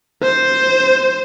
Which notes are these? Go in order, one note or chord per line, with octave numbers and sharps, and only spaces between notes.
C5